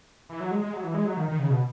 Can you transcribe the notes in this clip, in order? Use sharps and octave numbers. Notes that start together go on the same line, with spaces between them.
E3
F#3
G#3
G#3
F#3
E3
G#3
F#3
D#3
D#3
C#3
B2